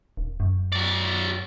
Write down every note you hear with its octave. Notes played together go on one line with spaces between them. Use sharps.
D#1
F#2
F#3 D5